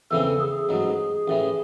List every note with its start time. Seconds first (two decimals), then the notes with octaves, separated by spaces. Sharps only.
0.11 E2 C#3 E3 C4 A4
0.40 G#4
0.69 A1 G#2 F#3
1.28 A1 A2 E3